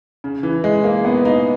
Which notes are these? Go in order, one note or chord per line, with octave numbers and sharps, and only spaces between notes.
C#3
E3
G#3
A#3
B3
D#4